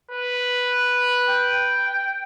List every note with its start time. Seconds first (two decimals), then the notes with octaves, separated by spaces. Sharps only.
0.11 B4
1.29 G5